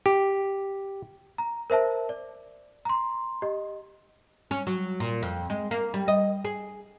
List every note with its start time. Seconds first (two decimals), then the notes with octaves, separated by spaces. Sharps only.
0.06 G4
1.38 A#5
1.70 A#4 C5 E5 A5
2.09 D5
2.85 A#5 C6
3.42 G4 D#5
4.51 C#4
4.67 F#3
5.00 A#2
5.23 F2
5.50 G#3
5.71 A#3
5.94 G3
6.08 D#5
6.45 G#4